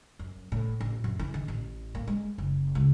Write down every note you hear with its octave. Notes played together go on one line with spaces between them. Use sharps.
F#2
A2
A1
F#2
E3
D#3
A1
A#3
G#3
F#1
C#2